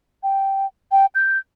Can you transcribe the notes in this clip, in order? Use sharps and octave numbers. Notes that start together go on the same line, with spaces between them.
G5
G5
G6